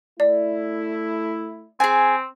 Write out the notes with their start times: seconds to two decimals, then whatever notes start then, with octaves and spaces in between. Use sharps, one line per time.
0.20 A3 E4 D5
1.80 C4 G#4 G#5